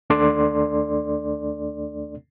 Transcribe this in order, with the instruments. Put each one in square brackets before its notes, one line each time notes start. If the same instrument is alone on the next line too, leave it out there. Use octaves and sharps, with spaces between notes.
[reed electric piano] D#2 A3 D4 A4 D5 C6